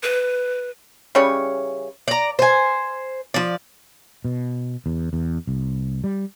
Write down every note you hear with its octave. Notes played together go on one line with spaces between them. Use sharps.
B4
C#3 E3 G3 C#5
D5 A#5
C5 G#5
F3 D5
B2
E2
E2
C2
G3